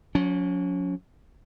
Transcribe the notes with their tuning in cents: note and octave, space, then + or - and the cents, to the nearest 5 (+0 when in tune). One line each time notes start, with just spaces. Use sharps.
F#3 -40 C#4 +25